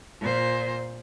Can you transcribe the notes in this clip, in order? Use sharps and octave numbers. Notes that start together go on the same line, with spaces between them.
A#2 C5